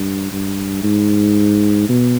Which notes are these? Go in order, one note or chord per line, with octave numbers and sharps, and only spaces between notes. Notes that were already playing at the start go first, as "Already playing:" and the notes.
Already playing: G2
G2
G#2
B2